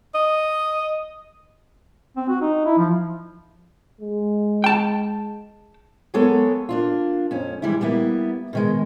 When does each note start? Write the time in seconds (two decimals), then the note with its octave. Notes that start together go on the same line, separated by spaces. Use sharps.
0.14 D#5
2.16 C4
2.29 F#4
2.42 D#4
2.66 E4
2.78 F3
4.01 G#3
4.64 G5 A5
6.14 F#3 G#3 A#3 B3 A4 C#5
6.69 A#3 D4 F4
7.31 F2 C#4
7.62 E3 G3 G#3 E4
7.81 G3 A#3 B3 E4
8.53 B2 D#3 G#3